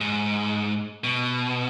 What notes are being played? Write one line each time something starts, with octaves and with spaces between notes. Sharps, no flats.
G#2
B2